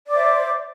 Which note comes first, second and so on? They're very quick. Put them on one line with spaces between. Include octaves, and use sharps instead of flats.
D5 D6 C5 E5